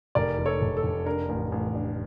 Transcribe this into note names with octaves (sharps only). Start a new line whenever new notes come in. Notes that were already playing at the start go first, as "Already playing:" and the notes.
F1 A#4 D5
F1
A4 C#5
F1
A4
F1
D4 A#4
A1
A1
D4